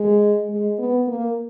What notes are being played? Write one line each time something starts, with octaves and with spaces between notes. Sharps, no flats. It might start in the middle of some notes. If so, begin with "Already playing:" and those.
Already playing: G#3
G#3
B3
A#3